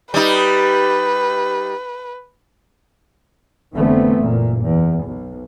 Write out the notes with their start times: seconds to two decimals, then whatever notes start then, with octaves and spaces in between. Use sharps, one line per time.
0.14 G3 D#4 B4
3.75 F1 D3 E3 A3 B3 C4
4.16 F#1 A#2
4.63 E2
5.05 B1